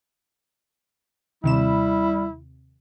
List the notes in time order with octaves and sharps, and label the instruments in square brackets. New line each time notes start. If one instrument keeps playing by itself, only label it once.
[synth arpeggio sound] D#2 C3 E7 [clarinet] G3 [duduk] E4